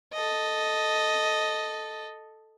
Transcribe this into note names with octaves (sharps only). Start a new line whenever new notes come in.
A4 D#5